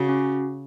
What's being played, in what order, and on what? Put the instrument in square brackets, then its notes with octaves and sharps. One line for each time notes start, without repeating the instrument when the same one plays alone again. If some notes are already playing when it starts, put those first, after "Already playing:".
Already playing: [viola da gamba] C#3 [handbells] F#4
[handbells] C#4